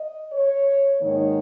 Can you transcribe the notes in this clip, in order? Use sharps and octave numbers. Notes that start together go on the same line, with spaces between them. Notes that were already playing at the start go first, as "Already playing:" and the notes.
Already playing: D#5
C#5
G#2 D#3 A#3 D#4 C#5